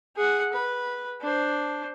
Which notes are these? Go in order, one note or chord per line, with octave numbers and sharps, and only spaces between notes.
G#4 F#5
B4
D4 C5